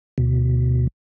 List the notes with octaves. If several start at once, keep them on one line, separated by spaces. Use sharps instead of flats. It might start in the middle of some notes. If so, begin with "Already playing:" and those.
D2 B2